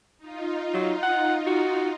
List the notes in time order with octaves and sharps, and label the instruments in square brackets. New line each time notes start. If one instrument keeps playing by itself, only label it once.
[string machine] D#4 F4
[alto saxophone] F#3
F#5
F#4